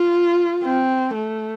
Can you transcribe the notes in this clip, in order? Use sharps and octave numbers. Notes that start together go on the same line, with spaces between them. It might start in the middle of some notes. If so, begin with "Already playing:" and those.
Already playing: F4
C4
A3